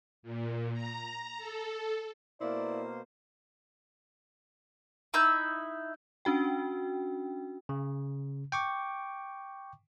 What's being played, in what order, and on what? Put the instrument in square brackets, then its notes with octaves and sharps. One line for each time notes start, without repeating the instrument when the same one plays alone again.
[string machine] A#2
A#5
A4
[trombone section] B2 A#3 [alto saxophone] E4 [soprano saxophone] C5 [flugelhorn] D5
[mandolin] D#4 E4 E6 G6
[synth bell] C#4 D4 F#4 G5
[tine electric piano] C#3
G5 C#6 D6